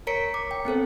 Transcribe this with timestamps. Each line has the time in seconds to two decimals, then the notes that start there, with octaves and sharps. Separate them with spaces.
0.07 A#4 C#5 A#5 B6 C#7 D7
0.34 D6
0.51 G5
0.65 B3 C4 A4 C5